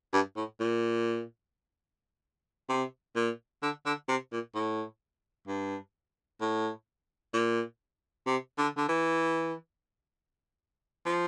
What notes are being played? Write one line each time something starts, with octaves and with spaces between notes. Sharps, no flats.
G2
A2
A#2
C3
A#2
D3
D3
C3
A#2
A2
G2
A2
A#2
C3
D3
D3
E3
F3